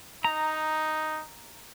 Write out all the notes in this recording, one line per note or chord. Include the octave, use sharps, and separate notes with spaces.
D#4 A#5